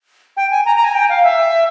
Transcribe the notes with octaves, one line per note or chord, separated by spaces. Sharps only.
G5
G#5
A#5
A#5
G#5
G5
F5
E5